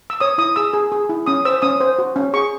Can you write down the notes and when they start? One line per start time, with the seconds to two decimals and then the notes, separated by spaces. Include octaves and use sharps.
0.10 E6
0.20 C#5 D#6
0.38 E4 D#6
0.56 G#4 E6
0.74 G#4
0.92 G#4
1.09 E4
1.26 C#4 D#6
1.45 C5 E6
1.62 C#4 D#6
1.80 C5
1.99 F#4
2.16 C#4
2.34 G#4 C#6